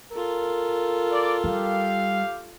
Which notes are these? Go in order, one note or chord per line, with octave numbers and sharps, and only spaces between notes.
F4 A4 A#4
D5
G3 G4 F5